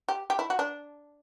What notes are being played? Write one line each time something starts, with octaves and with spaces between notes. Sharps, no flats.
G4
G4
E4
F#4
D4